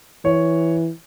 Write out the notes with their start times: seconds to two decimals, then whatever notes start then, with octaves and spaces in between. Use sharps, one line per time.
0.25 E3 C#5